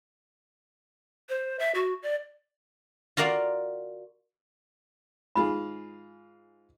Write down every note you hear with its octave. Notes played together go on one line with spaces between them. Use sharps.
C5
E5
F#4
D5
F4 F#4 A#4 D5 F5
G#2 F4 G#4 B5